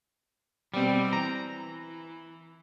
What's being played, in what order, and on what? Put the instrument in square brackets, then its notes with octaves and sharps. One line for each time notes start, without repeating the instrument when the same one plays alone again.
[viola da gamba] B2 C4 [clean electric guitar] G3
[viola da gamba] E3 [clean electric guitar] A#5